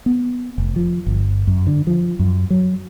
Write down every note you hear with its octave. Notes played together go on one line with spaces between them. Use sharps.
B3
F1
F3
G1
F#2
D3
F3
F#2
F#3